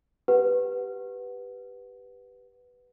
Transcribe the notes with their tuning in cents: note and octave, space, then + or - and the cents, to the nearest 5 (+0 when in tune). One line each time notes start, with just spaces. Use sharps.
G4 +0 B4 +0 F#5 +0